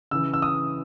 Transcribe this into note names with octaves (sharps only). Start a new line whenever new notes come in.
C#3 E3 E6
E6
D#6